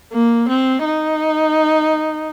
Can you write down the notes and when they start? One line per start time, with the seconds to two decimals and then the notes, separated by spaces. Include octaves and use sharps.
0.13 A#3
0.48 C4
0.85 D#4